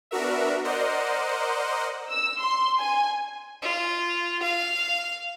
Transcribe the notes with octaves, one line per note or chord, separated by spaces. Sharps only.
B3 D4 F#4 A#4 E5
A#4 C5 D5 D#5 F#5
E6
C6
G#5
F4
F5